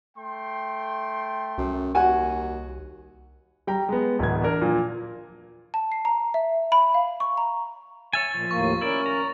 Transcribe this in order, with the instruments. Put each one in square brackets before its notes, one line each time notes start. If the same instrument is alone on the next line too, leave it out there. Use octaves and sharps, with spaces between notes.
[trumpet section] A3 G5 C6
[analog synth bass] C2 [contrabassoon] F#2
[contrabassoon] D#2 [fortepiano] F#4 G#5
[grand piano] G3 G5 A#5
G#3 B3
D1 E2 G#6
D4 A#4
A#2 F3
[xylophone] A5
C7
A#5
E5
B5
F5
C#6
A#5
[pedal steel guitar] C#5 E5 G#5 [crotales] A6
[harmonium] A#2 [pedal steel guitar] F3
[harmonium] D#2 A2 A#3 [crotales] C#6
[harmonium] C#4 A#4 [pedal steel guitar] E4 D5
[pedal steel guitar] A#5